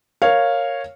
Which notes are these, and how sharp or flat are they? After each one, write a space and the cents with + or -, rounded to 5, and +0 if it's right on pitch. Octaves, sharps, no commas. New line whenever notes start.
A#4 +0 C#5 -5 F5 +0